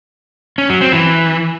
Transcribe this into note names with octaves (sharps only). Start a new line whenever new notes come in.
C#4
F#3
C4
E3